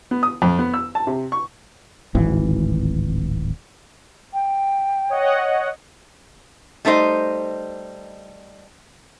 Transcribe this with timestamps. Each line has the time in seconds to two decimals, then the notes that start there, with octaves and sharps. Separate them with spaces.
0.11 B3
0.23 D#6
0.42 F2
0.59 B3
0.74 E6
0.95 A5
1.07 C3
1.32 C#6
2.15 D1 G#1 E3
4.34 G5
5.10 C#5 D#5 F#5
6.85 G3 A3 D#4 C5 D#5